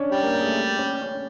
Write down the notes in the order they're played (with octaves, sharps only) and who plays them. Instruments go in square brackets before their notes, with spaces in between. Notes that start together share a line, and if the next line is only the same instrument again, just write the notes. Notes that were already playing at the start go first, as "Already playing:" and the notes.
Already playing: [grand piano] C#4 D4 C#5 D5
[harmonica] G3 G4
[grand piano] A#3 A#4
A#3 A#4
G#4
A3 A4
C#4 C#5
C#4 C#5